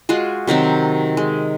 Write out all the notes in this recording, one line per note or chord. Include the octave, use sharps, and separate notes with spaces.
G#3 F4 F#4 G#4
C3 D#3 F#3 C4
G#3